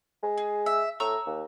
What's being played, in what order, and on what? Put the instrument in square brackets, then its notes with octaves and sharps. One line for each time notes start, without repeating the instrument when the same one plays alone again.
[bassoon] G#3
[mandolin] G#4
E5
[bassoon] A2 [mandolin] A#5 C#6 E6
[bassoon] D#2